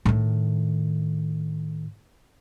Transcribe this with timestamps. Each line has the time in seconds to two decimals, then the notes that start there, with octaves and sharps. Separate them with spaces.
0.05 A2 D#3